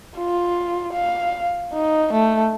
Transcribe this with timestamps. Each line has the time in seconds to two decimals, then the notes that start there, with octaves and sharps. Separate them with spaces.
0.18 F4
0.94 F5
1.73 D#4
2.13 A3